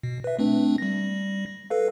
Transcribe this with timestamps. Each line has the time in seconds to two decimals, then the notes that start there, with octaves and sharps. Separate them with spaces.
0.03 B2
0.24 B4 E5
0.39 A3 C4 D4
0.78 G3 A#6
1.70 A4 B4 F5